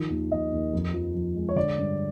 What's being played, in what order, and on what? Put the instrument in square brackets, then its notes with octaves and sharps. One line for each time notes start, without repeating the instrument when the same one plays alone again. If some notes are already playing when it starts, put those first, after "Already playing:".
Already playing: [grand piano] D#3 F3
D#2
D#2 D#5
D#2
F2
F3
F3
G#3
C#5
D3 D5
G2